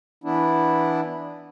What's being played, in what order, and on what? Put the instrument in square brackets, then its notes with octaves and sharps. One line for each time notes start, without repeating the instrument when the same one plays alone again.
[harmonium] E3 B3 D4 E4